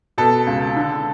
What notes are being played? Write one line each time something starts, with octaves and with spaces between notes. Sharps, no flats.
B2 A4
C#2
D3